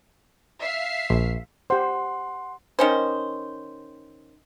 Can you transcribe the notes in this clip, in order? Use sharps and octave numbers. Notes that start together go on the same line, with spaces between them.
E5 F5 C7
A#1
G4 C5 F#5 C6
D#3 C#4 C5